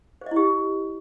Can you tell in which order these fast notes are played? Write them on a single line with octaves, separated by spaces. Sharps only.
C5 D#5 E4 G4